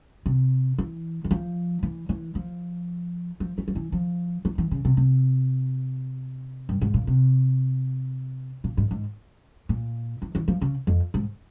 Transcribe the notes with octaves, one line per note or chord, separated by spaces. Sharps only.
C3
E3
E3
F3
E3
E3
F3
F3
E3
F3
E3
F3
E3
E3
C#3
C3
C3
G2
G#2
A#2
C3
A#2
G#2
G#2
A#2
E3
E3
F3
C#3
F2
G#2